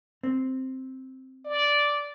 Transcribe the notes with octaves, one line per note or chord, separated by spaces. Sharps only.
C4
D5